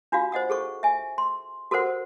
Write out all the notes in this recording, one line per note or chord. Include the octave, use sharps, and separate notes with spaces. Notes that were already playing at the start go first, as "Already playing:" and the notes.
D4 F4 F#4 F5
C5 D#5 F#5 D#6
G#4 A4 C#6
E5 G#5
C6
F#4 A4 A#4 C5 F#5